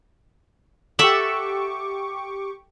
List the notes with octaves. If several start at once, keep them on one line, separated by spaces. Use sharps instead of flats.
G4 A4 E5 F#5 C#6 D6